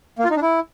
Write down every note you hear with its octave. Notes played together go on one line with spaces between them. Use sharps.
A#3
F4
D#4
D4
E4